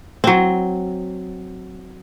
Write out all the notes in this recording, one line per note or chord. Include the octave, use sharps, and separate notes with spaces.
F#3 C4